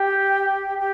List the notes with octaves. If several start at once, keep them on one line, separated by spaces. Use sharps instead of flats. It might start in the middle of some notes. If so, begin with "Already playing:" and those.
Already playing: G4
G4